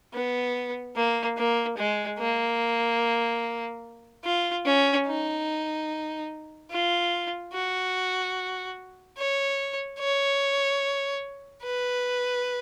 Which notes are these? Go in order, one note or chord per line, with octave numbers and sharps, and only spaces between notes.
B3
A#3
A#3
G#3
A#3
F4
C#4
D#4
F4
F#4
C#5
C#5
B4